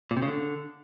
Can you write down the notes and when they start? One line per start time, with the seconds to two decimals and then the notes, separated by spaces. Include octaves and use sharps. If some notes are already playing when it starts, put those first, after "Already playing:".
0.11 A#2
0.17 C3
0.22 C#3
0.28 D3